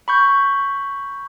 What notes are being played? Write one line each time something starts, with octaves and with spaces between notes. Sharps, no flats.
B5 C#6 G6